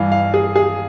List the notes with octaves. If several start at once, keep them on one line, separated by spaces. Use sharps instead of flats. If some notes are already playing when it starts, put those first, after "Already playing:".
Already playing: G2 E3 F5
F5
G#4
G#4